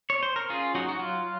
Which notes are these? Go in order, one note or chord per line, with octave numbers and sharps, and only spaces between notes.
C#5
C5
A#4
C#4 F4 G#4
F#3 D#4 F#4
F#4
F#3 F4